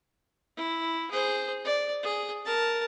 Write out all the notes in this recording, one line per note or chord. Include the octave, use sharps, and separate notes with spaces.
E4
G#4 C5
D5
G#4
A#4 A5